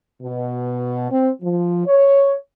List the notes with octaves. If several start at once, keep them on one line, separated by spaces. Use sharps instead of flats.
B2
C4
F3
C#5